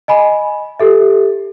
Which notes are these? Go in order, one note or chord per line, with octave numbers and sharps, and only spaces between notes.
D#5 G#5 B5
G4 A4 E5